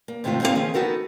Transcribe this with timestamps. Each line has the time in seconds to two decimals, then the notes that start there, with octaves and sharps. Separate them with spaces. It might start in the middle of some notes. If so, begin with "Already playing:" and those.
0.08 A#3
0.24 G#2 C3 D#3 A3 D#4 F4
0.42 A#3 C4 D#4 E4 A4 F5
0.55 D#3 F3 C#4 G#4
0.74 B3 D#4 F#4 A4 A#4